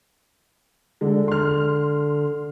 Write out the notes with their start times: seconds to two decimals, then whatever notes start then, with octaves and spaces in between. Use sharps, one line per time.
1.01 D3 G#3
1.28 C6 F6